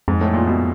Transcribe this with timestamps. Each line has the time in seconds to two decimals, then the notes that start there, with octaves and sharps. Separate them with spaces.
0.08 F2 G#2
0.21 A2
0.34 A#2
0.47 B2